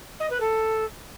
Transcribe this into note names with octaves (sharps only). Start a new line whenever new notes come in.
D#5
B4
A4